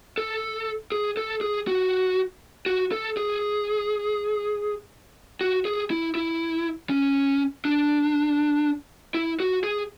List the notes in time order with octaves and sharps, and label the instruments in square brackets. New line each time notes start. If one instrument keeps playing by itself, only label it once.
[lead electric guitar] A4
G#4
A4
G#4
F#4
F#4
A4
G#4
F#4
G#4
E4
E4
C#4
D4
E4
F#4
G#4